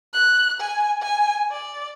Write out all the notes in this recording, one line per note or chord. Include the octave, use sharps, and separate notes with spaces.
F#6
G#5
G#5
D5